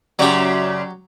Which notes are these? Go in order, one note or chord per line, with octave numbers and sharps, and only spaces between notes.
F#2 C#3 F#3 G4 D5